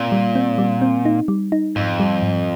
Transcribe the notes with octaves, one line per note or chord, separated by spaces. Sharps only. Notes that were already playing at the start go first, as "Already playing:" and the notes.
Already playing: A#2 C4
G3
C4
G3
C4
D#4
G3
D#4
F2 G#2
G3
G#2